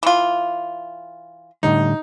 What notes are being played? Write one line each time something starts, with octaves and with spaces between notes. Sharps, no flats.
E3 F4
A2 D3 G3 D#4